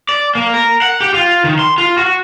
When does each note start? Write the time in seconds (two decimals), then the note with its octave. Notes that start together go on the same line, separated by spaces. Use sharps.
0.09 D5
0.35 A#3
0.54 A#4
0.82 F#5
1.01 G4
1.14 F4
1.44 D#3
1.59 C6
1.78 F4
1.98 F#4